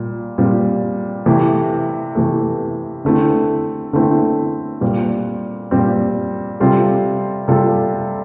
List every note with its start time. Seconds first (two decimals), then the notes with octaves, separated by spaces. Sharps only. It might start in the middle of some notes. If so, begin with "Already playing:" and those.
Already playing: A#2 G3
0.38 A#2 G3 C4
1.26 C3 E3 A3
2.15 C3 E3 A3
3.05 D3 A3 C4 E4
3.93 D3 A3 C4 E4
4.81 A#2 G3 C4
5.71 A#2 G3 C4
6.60 C3 G3 C4 F4 A4
7.48 C3 G3 C4 F4 A4